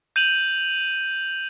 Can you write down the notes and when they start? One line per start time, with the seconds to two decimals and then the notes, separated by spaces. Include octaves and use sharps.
0.16 G6 D#7 F7 F#7